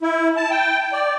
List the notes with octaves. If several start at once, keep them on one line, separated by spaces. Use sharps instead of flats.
E4
A5
G5
D5